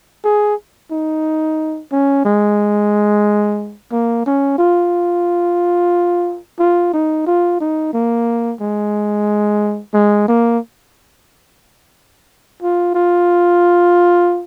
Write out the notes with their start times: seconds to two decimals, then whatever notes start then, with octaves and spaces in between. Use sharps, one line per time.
0.25 G#4
0.92 D#4
1.92 C#4
2.25 G#3
3.92 A#3
4.26 C#4
4.59 F4
6.59 F4
6.93 D#4
7.27 F4
7.61 D#4
7.94 A#3
8.61 G#3
9.94 G#3
10.28 A#3
12.63 F4
12.95 F4